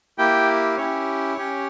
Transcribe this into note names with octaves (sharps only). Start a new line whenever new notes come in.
A#3 E4 G4 G5
C#4 E4 G4 C#5
C#4 G4